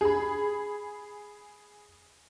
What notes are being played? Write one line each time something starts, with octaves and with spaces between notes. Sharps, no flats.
G#4 B5